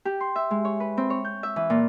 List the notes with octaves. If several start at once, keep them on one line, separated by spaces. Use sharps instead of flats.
G4
C6
E5
G#3
C#5
B4
C4
C#5
G6
E5
E3
A#2